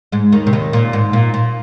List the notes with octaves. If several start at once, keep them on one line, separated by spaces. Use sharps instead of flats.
G#2 G#3
D#2 D#3
C3
D#2 D#3
A#2
G#2
A#2
A#2